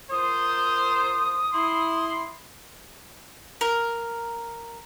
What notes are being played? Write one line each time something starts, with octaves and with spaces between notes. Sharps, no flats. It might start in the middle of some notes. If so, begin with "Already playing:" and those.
F4 A#4 C5 D#6
E4 C6
A#4